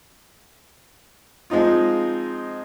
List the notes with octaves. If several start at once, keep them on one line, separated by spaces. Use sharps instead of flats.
F3 G#3 C4 D#4 F4